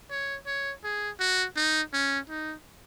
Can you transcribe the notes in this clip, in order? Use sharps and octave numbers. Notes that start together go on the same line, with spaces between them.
C#5
C#5
G#4
F#4
D#4
C#4
D#4